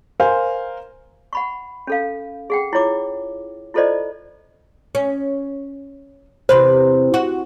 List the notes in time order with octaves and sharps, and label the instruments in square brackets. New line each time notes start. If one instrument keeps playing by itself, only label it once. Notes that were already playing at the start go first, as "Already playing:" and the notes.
[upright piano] A#4 C5 F5 G#5
[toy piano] F#5 B5 C#6
C#4 A4 F5
G#4 F#5 G5
E4 F4 C#5 D6
E4 F4 A4 C5 D5 D#5
[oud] C#4
[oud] E2 C3 B4 [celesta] C5
[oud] F#4